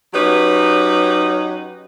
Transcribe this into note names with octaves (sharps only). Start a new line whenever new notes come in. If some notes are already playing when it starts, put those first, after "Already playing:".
F#3 C#4 D#4 G4 B4